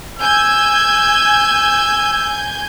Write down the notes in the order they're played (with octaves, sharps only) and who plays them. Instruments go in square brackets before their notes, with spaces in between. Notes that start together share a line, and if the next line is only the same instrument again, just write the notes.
[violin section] G#5 G6 G#6 [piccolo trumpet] E6